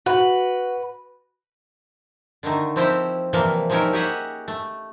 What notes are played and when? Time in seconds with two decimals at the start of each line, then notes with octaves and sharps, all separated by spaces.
0.06 F#4 B4
2.43 D3 D#3 A3 D#4
2.76 F3 C4 D#4 E4 G4 C5
3.33 C3 E3 F3 G3 A#3
3.70 F3 G3 C#4 D#4 E4 A#4
3.93 G4 G#4 C#5 D#5 E5 F#5
4.48 A3